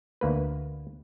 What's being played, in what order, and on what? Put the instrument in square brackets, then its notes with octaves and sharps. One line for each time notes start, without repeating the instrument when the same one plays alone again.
[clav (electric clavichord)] D2 A#3 B4